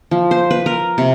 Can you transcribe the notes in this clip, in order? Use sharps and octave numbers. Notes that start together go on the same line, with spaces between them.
F3
C5
B4
A#4
C3